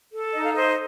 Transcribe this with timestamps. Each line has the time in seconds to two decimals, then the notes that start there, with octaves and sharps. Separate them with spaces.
0.13 A4
0.33 D#4 D#5
0.44 F5
0.53 C5 D#5